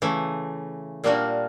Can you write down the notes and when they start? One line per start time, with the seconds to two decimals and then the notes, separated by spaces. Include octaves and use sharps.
0.02 C#3 E3 A3
1.04 A#2 G3 A#3 D4 F#4